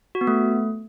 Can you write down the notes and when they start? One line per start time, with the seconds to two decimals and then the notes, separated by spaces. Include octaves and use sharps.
0.15 F#4
0.21 B3
0.27 A3